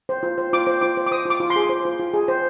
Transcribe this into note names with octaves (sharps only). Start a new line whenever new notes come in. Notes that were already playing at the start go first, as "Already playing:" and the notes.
C5
F4
C5
F4 D6
C5
F4 D6
C5
D6
C5 D#6
F4 D6
F4
C6
G#4
C5
F4
F4
G#4
C5